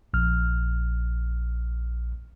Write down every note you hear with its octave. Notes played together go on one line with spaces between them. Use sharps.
A#1 F6